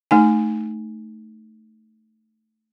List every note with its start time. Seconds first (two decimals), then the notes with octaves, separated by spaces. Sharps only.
0.11 A3 D#4 G#5